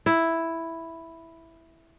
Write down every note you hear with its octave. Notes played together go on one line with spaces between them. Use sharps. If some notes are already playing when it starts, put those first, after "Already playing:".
E4